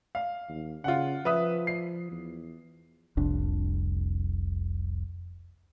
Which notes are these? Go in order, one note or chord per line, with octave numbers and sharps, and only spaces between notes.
F5
D#2
C#3 F4 F#5
F3 B4 E5 D#6
C7
E2
F1 C2 F2 D4